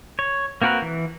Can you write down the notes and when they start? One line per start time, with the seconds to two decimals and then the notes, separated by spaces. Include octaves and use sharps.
0.19 C#5
0.62 A#3 C4 F#4 A#4 B4
0.82 E3